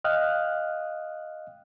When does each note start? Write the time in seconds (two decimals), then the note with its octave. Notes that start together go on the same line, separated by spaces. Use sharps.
0.04 D#5 F5 G5 D#6 F6 F#6